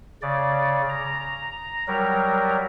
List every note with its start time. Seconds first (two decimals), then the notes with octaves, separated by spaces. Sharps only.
0.22 C#3 D5
0.89 A#5
1.88 F#3 G3 A#4